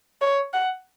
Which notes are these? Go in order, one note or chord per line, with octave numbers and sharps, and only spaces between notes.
C#5
F#5